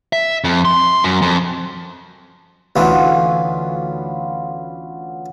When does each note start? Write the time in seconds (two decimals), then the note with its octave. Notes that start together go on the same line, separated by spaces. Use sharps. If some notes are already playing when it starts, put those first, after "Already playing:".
0.13 E5
0.44 F2
0.65 C6
1.04 F#2
1.22 F2
2.76 D2 E3 B3 C#4 F4